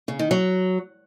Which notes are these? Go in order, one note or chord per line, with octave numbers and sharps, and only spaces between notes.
C#3
D#3
F#3